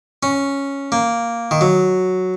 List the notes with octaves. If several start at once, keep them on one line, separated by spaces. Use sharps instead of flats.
C#4
A#3
D#3
F#3